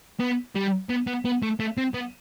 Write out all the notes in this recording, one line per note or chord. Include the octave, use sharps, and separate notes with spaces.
B3
G3
B3
B3
B3
A3
A3
C4
B3